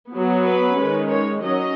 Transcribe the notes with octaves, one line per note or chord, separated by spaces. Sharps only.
F#3 B3
B4
D#3 G#3 C#4
C#5
F#3 C#4 D#5